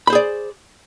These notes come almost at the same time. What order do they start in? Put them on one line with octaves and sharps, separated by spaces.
B5 C5 G#4 D5